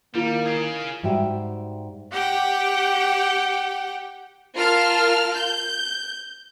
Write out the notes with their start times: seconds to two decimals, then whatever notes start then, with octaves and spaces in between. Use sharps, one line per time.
0.15 D#3 G3 A#3 E4 F4
0.45 G#4 F5
1.03 G#2 G3 F#4 E5 G5
2.11 G4 F#5 G5
4.55 F4 A#4 A5 F6
5.34 G6